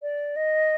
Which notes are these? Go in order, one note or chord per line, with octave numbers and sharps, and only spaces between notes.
D5
D#5